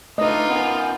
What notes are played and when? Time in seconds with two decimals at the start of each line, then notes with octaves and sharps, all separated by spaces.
0.18 A3 D4 D#4 F4 B4 D#5
0.49 B3 C#4 A#4 G#5